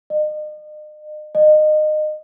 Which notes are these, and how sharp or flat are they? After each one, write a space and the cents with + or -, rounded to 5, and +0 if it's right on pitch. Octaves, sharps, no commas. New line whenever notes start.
D#5 -40
D#5 -25